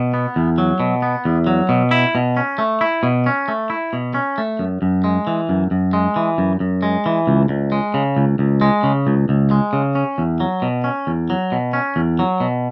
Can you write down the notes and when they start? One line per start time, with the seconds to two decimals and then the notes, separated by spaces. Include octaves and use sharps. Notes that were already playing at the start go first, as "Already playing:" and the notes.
Already playing: B2
0.14 B3
0.36 E2
0.58 F#3
0.80 B2
1.02 B3
1.25 E2
1.47 F#3
1.69 B2
1.91 E4
2.15 B2
2.37 C#4
2.58 A3
2.81 E4
3.03 B2
3.26 C#4
3.48 A3
3.70 E4
3.93 B2
4.14 C#4
4.38 A3
4.59 F#2
4.82 F#2
5.04 G#3
5.27 E3
5.49 F#2
5.71 F#2
5.93 G#3
6.16 E3
6.38 F#2
6.60 F#2
6.83 G#3
7.06 E3
7.27 C#2
7.49 C#2
7.72 G#3
7.94 C#3
8.17 C#2
8.39 C#2
8.61 G#3
8.83 C#3
9.07 C#2
9.29 C#2
9.51 G#3
9.73 C#3
9.95 C#4
10.18 E2
10.40 F#3
10.62 B2
10.84 C#4
11.07 E2
11.30 F#3
11.52 B2
11.73 C#4
11.96 E2
12.19 F#3
12.40 B2